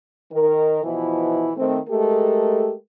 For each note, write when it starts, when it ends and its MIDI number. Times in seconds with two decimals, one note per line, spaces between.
0.32 0.81 51
0.32 0.81 70
0.83 1.51 47
0.83 1.51 52
0.83 1.51 53
0.83 1.51 64
1.57 1.78 51
1.57 1.78 57
1.57 1.78 60
1.89 2.73 56
1.89 2.73 57
1.89 2.73 67
1.89 2.73 69
1.89 2.73 70